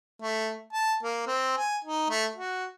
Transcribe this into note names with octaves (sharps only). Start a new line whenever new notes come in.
A3
A5
A#3
C4
G#5
D#4
A3
F#4